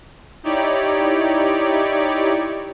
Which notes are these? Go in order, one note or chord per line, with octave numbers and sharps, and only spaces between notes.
D#4 E4 G4 C#5 D5